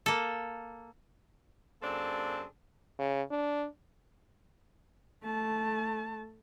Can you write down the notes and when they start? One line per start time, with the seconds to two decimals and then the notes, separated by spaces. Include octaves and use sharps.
0.06 A#3 A4
1.82 F#2 A#3 C4 D4 G#4 A4
2.99 C#3
3.31 D4
5.23 A3 A5